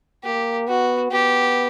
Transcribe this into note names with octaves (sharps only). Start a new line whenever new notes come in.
A#3 G4
B3 F#4
B3 G4